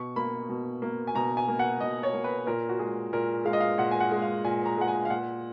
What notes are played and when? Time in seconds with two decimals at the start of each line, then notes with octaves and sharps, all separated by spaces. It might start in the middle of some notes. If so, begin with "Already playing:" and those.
Already playing: B2 C#6
0.16 A#3 B5
0.49 B2
0.82 A#3
1.07 G#5
1.15 B2 A#5
1.37 G#5
1.48 A#3
1.59 F#5
1.80 B2 D#5
2.03 C#5
2.13 A#3
2.24 B4
2.47 A#2 A#4
2.69 F#4
2.79 G#3 G#4
3.13 A#2 A#4
3.45 G#3 F5
3.53 D#5
3.60 F5
3.78 A#2 F#5
3.91 G#5
4.00 F#5
4.11 G#3
4.22 F5
4.44 A#2 G#5
4.66 A#5
4.78 G#3 F#5
4.88 G#5
5.05 F5
5.10 A#2 F#5